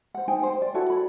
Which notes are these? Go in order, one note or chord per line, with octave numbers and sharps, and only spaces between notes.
C5 F#5
D#4 C5 G5 G#5
C5
D5
E4 F#4 A4 C#5
B5